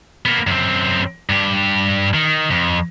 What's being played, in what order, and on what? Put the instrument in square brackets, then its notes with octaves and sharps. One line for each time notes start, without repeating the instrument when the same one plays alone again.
[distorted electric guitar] A#3 B3
F#2 C4
G2 G4
D#3
F2